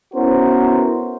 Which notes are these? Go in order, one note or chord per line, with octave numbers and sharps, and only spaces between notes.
B3 C#4 E4 F#4 A#4 C5